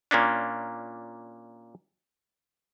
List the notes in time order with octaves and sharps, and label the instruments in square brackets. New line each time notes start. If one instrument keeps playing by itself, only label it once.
[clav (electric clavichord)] A#2 A#3 C#4 D4